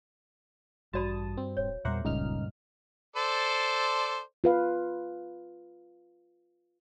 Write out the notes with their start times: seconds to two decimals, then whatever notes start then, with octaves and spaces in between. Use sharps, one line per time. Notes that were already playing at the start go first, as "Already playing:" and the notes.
0.94 A1 G2 F#4 D5 A5 B5 D#6
1.37 C4
1.57 D#1 C#5
1.85 E2 A#2 G3 A#4 C5 E5 F#5 D6
2.05 D#1 C#2 G2 A#2 G3 D#4 F6
3.16 A4 C5 D5
4.44 F4 B4 F5